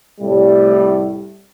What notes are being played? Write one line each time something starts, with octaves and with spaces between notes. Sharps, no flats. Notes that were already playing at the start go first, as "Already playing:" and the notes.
C2 A2 G3